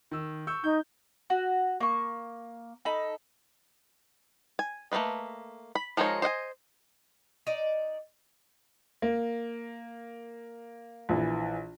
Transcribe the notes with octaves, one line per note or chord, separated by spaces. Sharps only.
D#3 E6
C#6 E6 G6
D#4 G6
F#4
A#3 C#6
D#4 A4 B5
G#5
A3 A#3 C4 B4 D#5
B5
F3 G#3 D#4 A#4 C#5
C5 D#5 F#5 G#5
D#4 D5
A#3
A#1 E3